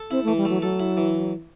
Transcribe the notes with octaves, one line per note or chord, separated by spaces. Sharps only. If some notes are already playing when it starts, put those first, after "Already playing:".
Already playing: A4
C4 E4
A3
E3
G3
F#3 A3
F#3 A4
E4
E3